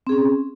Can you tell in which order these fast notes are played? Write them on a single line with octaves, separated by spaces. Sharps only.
C4 G#4 C#4